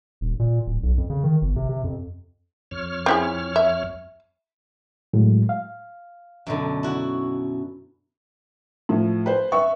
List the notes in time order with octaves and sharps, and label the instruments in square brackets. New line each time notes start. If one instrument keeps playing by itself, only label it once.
[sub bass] D#1
A#2
D1
B1
F2
C#3
D#3
G1
C3
C3
F2
[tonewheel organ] F2 C#5 F6
[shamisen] C4 E4 G#4
E5
[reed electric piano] A2 F#3 G#3
F5
[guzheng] F#2 B2 D3
E4 F#4
[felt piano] A2 F3
B4 C5
B4 E5 C#6